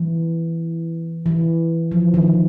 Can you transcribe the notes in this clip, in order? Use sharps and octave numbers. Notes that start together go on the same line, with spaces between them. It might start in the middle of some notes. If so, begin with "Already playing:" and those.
Already playing: E3
E3
F3
D#3